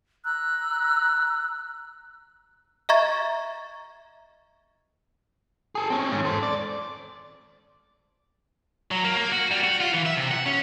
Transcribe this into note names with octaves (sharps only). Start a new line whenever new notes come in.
A#5 E6 F#6
D#5 E5 A#5 C#6 G#6 A6
G#4 A4
C4 C#4
G#2 D#3
A4 C5
D5
F#3
A#3
A#3
F#4
G3
F#4
F4
E3
E5
C3
F#5
C#4